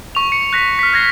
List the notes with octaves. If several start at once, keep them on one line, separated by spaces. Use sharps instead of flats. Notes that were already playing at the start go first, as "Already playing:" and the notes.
C#6 F7
C#7
F#6 A#6 B6
F6 B6
F6 G#6 A#6 C7